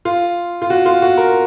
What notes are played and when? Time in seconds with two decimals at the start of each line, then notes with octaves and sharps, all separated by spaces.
0.05 F4
0.62 F4
0.70 F#4
0.86 F4
1.02 F#4
1.17 A#4